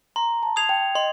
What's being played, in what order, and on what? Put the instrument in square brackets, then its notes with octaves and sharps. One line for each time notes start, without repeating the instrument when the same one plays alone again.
[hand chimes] A#5 [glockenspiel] C6
[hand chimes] A5
[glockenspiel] D#6 G#6 C7 F7
[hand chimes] G5
[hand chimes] D#5 [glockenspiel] C6